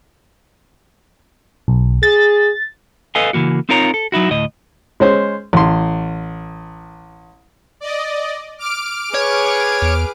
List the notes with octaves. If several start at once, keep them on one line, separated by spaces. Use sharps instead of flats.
B1
G#4 A6
A4 B4 D#5 F5 G#5
C#3 E3 A#3 F#4
C4 D#4 F4 A#4 C#5 A#5
A4
F#3 D#4 E4 F#4
D2 A2 D#5
G#3 C#4 C5
A1 C6
D5 D#5
D6 F6 D7
G#4 B4 C#5
E2